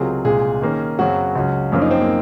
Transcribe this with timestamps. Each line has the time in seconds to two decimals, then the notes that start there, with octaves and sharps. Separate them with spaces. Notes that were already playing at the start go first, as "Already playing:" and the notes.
Already playing: C#2 C3 F#3 C4 F4 G#4 A#4
0.25 C2 A#2 G#3 G#4
0.62 D#3 A#3 C#4
0.98 F#2 C#3 F#3 C4 F#4
1.35 C#2 C#3 F#3 C#4
1.72 F#2 F3 A#3 C#4 F4
1.82 D#4
1.91 C4
2.01 A#3